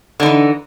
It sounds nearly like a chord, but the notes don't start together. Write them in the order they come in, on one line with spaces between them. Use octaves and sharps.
D3 D#4 E3